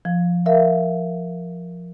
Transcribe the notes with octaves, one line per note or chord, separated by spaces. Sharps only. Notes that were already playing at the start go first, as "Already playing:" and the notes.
F3
A#4 E5 F5